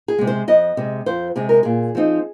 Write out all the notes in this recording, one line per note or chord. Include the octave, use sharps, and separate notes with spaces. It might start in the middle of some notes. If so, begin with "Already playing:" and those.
G#4
C3 G#3
C5
F2 D#5
C3 G#3
F2 C5
C3 G#3 G#4
A#4
A#2 G#4
F3 C4 D#4